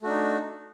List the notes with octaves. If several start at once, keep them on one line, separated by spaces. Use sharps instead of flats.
A3 D4 D#4 F#4